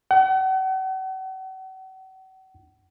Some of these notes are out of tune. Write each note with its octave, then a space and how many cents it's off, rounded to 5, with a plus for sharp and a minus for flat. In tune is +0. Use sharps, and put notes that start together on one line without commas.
F#5 +40